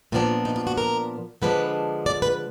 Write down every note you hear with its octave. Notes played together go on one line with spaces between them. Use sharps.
A#2 F3 B3 D4 F4
D#4
F4
F#4
A#4
D3 F3 G#3 D4 B4
D5
B4